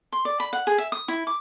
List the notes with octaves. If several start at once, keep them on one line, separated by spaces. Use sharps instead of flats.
C6
D5
B5
F#5
G#4
E5
D#6
E4
D6